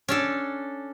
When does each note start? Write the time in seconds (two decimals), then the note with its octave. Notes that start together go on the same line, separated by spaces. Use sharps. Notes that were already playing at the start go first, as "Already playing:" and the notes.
0.08 C#4 D4 A4